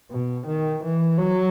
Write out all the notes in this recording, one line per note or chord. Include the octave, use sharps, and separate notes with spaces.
B2
D#3
E3
F#3